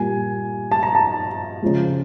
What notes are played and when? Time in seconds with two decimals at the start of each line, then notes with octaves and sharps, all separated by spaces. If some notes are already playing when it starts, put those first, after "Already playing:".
Already playing: A#2 G3 A#3 G#5
0.71 A5
0.83 A#5
0.95 A5
1.62 C#3 F3 G#3